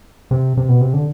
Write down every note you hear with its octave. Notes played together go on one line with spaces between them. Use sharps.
C3
C3
B2
C3
D3